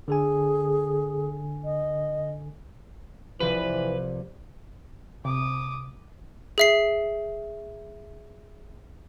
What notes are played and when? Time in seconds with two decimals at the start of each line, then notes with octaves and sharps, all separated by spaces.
0.08 D3 G#4 A4 G#5
1.64 D#5
3.40 C2 E3 F3 B4 D5
5.25 C3 D6 D#6
6.58 G#4 E5 C7